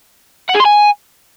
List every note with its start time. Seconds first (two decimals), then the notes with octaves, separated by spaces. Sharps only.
0.49 F#5
0.55 G#4
0.60 C6
0.65 G#5